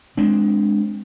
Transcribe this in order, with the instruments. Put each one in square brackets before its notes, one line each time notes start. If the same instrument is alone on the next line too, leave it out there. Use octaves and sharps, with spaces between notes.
[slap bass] G#3 C4 D4